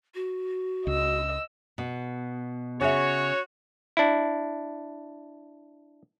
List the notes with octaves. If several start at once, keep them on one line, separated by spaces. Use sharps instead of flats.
F#4
C#2 D#5 E6
B2
C#3 F#4 C#5 E5
D4 E4